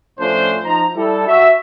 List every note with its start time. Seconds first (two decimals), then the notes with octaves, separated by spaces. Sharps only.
0.20 A2 F3 A3 C#4 D4 C5
0.65 F3 D#4 A#5
0.95 G3 E4 A4
1.27 F#4 E5